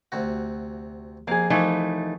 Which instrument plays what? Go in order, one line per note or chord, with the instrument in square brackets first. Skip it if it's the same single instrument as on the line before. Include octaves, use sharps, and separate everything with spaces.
[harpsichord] D2 C3 F#4
[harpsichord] F2 [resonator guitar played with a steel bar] A#3 G#4
[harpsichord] C2 F3 [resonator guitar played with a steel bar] E3 A3 D#4